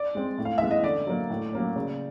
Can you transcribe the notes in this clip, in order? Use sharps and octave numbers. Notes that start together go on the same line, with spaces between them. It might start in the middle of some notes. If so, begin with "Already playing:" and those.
Already playing: D5
G#3 C4
A2
F5
E3 G#3 B3 E5
D#5
D3 D5
F#3 A#3
A2
F#3 A#3 C#4
C#3